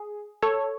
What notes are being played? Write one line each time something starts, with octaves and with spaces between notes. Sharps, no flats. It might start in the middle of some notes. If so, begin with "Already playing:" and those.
Already playing: G#4
A4 C#5